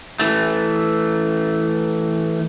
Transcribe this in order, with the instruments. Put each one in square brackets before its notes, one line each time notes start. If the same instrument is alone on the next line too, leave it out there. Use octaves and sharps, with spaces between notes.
[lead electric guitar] E3 A3